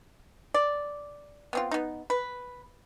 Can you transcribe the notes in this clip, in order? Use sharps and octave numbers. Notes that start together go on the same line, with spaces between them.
D5
B3 C4 F4
B3 D#4
B4